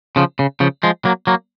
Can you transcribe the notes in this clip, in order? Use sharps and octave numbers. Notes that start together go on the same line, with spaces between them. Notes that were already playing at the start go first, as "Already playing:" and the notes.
C#3 F3
C#3
C#3 F3
F3 G#3
F#3 A#3
F#3 A#3